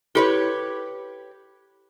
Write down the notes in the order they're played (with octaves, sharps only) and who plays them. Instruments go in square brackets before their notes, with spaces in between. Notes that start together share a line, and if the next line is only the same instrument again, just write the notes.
[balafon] E4 A4 [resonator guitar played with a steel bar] G4 B4 C#5